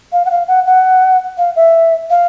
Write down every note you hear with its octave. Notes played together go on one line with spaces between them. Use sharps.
F5
F#5
F5
F#5
F#5
F5
E5
F5